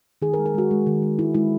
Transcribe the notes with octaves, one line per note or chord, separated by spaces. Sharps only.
D#3 G#4
A#4
G#3
A#4
G#3 F#4
G#3
D#3
G#3
G#3 E4
G#3 E4